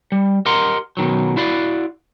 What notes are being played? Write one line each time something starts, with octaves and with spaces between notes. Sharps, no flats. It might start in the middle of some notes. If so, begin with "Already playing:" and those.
G3
G4 A#4 D#5 F#5 A#5 C6
B2 D#3 F#3
E4 F#4 D5 F5 F#5